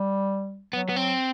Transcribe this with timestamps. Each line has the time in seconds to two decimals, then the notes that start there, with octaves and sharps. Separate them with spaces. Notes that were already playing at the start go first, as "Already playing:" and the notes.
Already playing: G3
0.73 F#3 B3
0.89 B3
0.96 C4